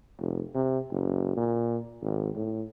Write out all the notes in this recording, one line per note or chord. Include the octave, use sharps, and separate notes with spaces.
F1
C3
F#1
A#2
G#1
A2